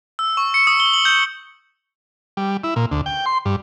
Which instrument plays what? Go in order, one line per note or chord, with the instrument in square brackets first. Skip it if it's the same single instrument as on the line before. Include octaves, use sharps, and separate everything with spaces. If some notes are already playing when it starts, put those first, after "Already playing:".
[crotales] E6
C#6
C#7
D#6
G7
F#7
G6
[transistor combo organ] G3
E4
A#2
D2
G5
C6
G2